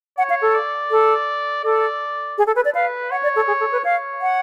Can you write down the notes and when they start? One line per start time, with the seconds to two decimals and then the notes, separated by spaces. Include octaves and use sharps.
0.18 C#5 F#5
0.30 F5
0.42 A4
0.54 D5
0.91 A4
1.64 A4 D5
2.38 G#4
2.47 A4
2.56 B4
2.65 D5
2.75 B4 F5
3.11 C#5 F#5
3.23 D5
3.36 A4
3.48 G#4
3.60 A4
3.72 B4
3.84 C#5 F5
4.21 F#5